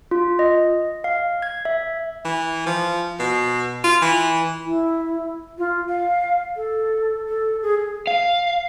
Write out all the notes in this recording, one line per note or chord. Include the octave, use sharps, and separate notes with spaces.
F4
D#5
F5
G#6
E5
E3
F3
B2
F4
E3
E4
F4
F5
A4
A4
G#4
F5